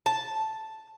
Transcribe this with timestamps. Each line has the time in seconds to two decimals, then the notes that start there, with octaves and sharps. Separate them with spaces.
0.06 A5